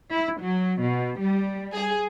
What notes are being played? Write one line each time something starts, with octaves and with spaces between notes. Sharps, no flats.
E4
F#3
B2
G3
G#4